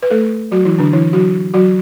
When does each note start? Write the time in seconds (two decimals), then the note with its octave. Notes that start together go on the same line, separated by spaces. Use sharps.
0.02 B4
0.10 A3 A4
0.52 F#3 F#4
0.65 E3 E4
0.79 D3 D4
0.93 E3 E4
1.13 F#3 F#4
1.54 F#3 F#4